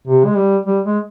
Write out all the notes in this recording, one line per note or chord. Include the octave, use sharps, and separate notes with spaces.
C3
G#3
G3
G3
G#3